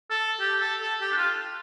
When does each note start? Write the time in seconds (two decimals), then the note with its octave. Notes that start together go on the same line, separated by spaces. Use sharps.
0.10 A4
0.40 G4
0.61 A4
0.81 A4
1.01 G4
1.12 D4
1.17 F4